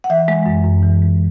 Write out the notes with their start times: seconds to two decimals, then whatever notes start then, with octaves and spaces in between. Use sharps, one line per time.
0.04 F#5
0.10 E3 E5
0.28 G#3
0.46 F#2
0.65 F#2
0.83 E3
1.02 G#3